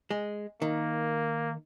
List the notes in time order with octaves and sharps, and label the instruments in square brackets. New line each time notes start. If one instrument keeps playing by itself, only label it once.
[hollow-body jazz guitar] G#3
[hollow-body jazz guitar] D#3 [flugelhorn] A#3